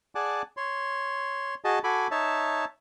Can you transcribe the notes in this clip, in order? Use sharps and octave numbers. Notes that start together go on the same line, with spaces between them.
G#4 D5 F#5 G#5 A5 D6
C#5 C6
F#4 G#4 D#5 A5
F#4 A4 G#5 B5 D6
D#4 C#5 E5 A5